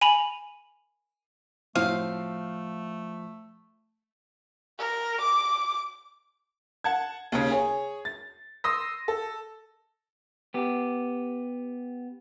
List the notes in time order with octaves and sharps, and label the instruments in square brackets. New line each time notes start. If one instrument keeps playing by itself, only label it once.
[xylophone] G#5 B5 F7 F#7
[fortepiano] A2 C4 F#4 [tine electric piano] F3 [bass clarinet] A3 [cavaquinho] F5
[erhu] A#4
D6
[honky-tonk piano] F#5 A5 G#6
D#2 C#3
G#4 C#5
A6
C6 D#6 E6 A#6
A4
[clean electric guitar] B3 G4